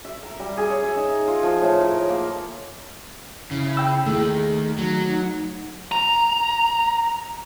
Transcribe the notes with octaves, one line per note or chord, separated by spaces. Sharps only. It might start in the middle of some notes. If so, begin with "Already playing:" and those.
E5
A#4
G3
G#4
C#5
E5
D#4
F4
F3
A2
A#4
A#3
C#3 E4
G5 E6
D#2 D#3 A3 G#4
F#3 D#4
A#5